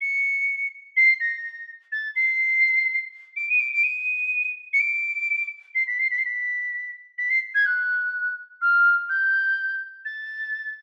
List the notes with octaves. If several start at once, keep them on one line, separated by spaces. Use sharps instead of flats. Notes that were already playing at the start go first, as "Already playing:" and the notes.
C#7
C7
A#6
A6
C7
D7
D#7
D7
D7
D#7
C#7
D7
C7
B6
C7
B6
C7
B6
B6
C7
G#6
F#6
F6
G6
A6